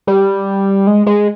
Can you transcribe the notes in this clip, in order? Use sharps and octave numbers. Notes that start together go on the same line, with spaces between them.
G3
G#3
G#3